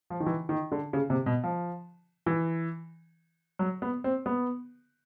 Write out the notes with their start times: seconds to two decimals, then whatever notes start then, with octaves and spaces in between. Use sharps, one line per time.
0.10 F3
0.20 D#3
0.26 E3
0.49 D#3
0.72 D3
0.93 C#3
1.10 C3
1.26 B2
1.44 F3
2.26 E3
3.59 F#3
3.82 B3
4.04 C4
4.26 B3